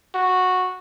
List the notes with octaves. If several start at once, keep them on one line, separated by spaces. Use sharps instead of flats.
F#4